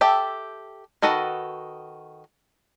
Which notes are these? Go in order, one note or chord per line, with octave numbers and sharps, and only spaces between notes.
G4 A4 E5 G5
D#3 F#4 A4 B4 D#5